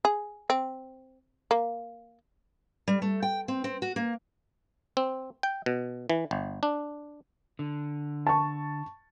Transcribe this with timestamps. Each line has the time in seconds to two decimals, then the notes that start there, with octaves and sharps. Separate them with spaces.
0.05 G#4
0.50 C4
1.51 A#3
2.88 G3
3.02 A3
3.23 G5
3.48 C4
3.64 C4
3.82 F#4
3.96 A#3
4.97 C4
5.43 G5
5.66 B2
6.10 E3
6.31 G1
6.63 D4
7.59 D3
8.27 A5 C#6